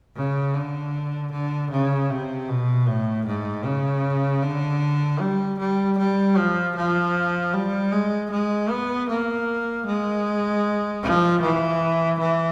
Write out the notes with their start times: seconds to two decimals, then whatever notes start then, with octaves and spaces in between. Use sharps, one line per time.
0.16 C#3
0.54 D3
1.32 D3
1.71 C#3
2.10 C3
2.49 B2
2.87 A2
3.26 G#2
3.65 C#3
4.43 D3
5.20 G3
5.59 G3
5.98 G3
6.37 F3
6.76 F3
7.54 G3
7.92 G#3
8.31 G#3
8.70 B3
9.09 A#3
9.86 G#3
11.03 F3
11.42 E3
12.19 E3